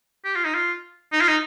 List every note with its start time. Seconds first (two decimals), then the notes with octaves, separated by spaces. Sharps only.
0.25 G4
0.35 F4
0.45 D#4
0.54 F4
1.12 D#4
1.21 F4
1.28 D#4